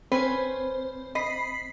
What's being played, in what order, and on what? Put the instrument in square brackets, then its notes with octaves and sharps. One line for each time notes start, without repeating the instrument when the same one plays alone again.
[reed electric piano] C4 [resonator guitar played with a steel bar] C#4 B4 [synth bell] C5
[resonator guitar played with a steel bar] D#5 [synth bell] B5 B6 C7